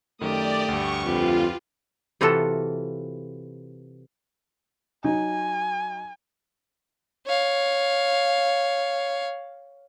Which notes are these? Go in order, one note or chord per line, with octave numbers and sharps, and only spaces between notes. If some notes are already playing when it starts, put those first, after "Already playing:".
F#2 D#3 A3 G4 D5 D#6
D2 G2 C#6
F2 F4 G4 B4
C3 E3 F4 F#4 A4
F#3 D#4 G#5
C#5 F5